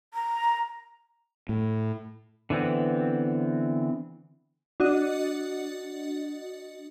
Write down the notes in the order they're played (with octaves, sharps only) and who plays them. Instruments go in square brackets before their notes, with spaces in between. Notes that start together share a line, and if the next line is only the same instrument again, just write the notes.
[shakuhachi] A#5
[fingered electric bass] A2
[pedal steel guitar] D3 E3 B3 C4
[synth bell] D4 F#4 D#5